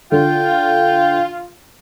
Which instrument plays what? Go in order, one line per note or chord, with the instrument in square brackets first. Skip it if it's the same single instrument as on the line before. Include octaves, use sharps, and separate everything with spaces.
[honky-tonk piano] D3 [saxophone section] F4 [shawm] G5